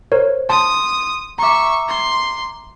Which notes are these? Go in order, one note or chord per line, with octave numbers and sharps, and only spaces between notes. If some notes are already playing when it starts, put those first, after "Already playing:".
A#4 C5 C#5
A5 C6 D#6
E5 A#5 C#6 D6
C6